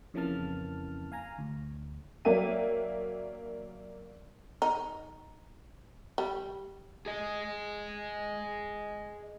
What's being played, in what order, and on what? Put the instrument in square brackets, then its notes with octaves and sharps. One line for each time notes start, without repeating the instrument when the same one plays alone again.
[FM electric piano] F2 C#3 E3 A#3 A5 F6
F5 G#5 A#5
D2
[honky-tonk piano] F#3 A#3 D4 E5 G5 D#7
[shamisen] D#4
G3
[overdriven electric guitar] G#4 D#5